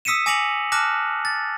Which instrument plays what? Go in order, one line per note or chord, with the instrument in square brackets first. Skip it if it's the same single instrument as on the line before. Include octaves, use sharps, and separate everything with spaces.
[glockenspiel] D#6 E6 B6 C#7 D#7 E7
G#5 D6 A#6 C#7 F7 F#7
A5 D6 F6 F#6 A#6
A6